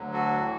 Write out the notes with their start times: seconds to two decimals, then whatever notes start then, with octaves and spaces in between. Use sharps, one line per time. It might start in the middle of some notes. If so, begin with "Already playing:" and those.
Already playing: D2 D3 F#3
0.13 F#4 A4
0.39 A2 E3